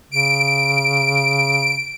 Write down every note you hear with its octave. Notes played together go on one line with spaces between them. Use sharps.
C#3 D7